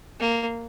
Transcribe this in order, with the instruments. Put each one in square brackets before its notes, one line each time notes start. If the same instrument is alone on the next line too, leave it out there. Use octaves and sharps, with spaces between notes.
[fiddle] A#3